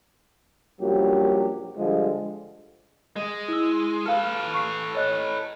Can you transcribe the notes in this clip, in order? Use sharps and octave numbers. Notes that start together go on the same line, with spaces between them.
A#1 F#2 F#3 G3 G4
D3 F3 G3 G#3
G#3 D#5
E4 E6
A4 B4 F5 F6
C#6 C7
C#5 D#5 F#6